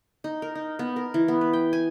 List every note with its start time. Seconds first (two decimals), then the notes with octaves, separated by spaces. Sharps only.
0.24 D#4
0.42 A#4
0.55 D#4
0.79 B3
0.96 A#4
1.14 E3
1.28 B3
1.41 B4
1.53 G5
1.73 G#5